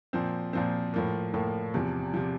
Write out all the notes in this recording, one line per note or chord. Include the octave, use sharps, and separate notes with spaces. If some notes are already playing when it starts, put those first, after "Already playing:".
A#2 F3 C4
A#2 F3 C4
A2 F3 A#3
A2 F3 A#3
E2 C3 F3
C3 F3